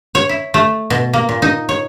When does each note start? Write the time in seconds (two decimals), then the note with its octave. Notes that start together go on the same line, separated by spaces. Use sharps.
0.15 C#5
0.29 E4
0.54 A3
0.90 B2
1.13 A#3
1.29 A#2
1.42 D#4
1.69 C#5